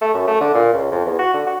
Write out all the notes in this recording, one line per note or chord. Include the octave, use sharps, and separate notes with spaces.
A3
F#2
A3
D3
A#2
C#2
F2
E2
F#4
D3
F#4